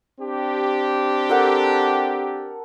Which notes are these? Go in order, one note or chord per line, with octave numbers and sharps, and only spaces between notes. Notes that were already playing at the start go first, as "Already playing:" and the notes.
C4 D4 G4
A4 A#4 F#5